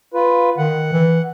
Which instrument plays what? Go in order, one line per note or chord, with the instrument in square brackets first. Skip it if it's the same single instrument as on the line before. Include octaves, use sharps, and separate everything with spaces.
[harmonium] F4 B4
[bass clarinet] D#3 [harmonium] F#5
[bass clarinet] E3